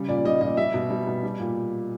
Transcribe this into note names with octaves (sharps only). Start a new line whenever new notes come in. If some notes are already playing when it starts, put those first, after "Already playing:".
Already playing: C#3 G3
A#2 D5
G3 D#5
A#2 D#5
G3 E5
B2
G3
B2
G3
A#2